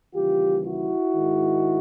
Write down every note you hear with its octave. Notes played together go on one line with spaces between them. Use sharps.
D#2 C#3 E3 G3 F4 G4
E4 F#4
G#2 D#3 G#3